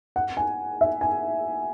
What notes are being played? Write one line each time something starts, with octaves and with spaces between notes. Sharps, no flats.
F#5
G#5
E5
G#5